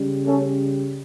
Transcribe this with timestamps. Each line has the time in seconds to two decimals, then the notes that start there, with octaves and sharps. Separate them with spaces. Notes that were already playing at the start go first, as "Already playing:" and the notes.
Already playing: C#3 G3
0.25 A3 C#4